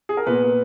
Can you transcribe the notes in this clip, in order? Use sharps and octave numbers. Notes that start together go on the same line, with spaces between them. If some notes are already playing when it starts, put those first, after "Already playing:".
G#4
A#4
A#2 B3 B4